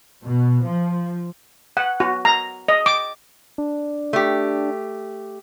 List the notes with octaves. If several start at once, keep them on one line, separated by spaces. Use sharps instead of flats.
B2
F3
F#5
F#4
A#5
D#5
D6
D4
A3 G4